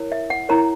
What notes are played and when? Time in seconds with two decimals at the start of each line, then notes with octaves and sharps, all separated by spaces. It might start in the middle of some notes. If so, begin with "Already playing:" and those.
Already playing: E4 A#4 C#5
0.12 E5
0.30 F#5
0.49 E4 A#4 C#5 A#5